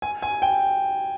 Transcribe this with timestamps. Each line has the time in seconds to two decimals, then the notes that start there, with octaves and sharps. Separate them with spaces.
0.02 G#5
0.22 G#5
0.42 G5